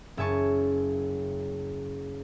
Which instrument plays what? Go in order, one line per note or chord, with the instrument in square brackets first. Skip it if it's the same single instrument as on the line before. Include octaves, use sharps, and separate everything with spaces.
[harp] F#1 E5 G#5 A5 C#6